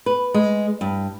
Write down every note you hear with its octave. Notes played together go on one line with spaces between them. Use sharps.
B4
G#3
G2